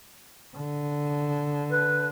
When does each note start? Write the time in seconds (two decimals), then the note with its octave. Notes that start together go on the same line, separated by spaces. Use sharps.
0.57 D3
1.70 B4